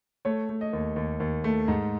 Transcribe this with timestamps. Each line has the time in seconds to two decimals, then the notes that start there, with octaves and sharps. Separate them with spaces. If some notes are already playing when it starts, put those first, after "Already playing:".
0.25 A3 C#5
0.49 A3
0.61 D#5
0.73 D#2
0.96 D#2
1.20 D#2
1.44 A3
1.68 G#2